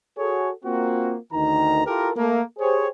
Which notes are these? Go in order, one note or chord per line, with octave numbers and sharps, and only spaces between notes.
F#4 G#4 A4 C#5
A#3 C4 F4 F#4
D2 D#3 D#4 A#5
E4 F4 G4 A4 A#4
A3 A#3
G4 G#4 C5 C#5